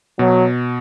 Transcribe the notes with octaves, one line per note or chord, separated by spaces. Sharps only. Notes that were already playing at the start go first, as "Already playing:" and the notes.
B2 F#3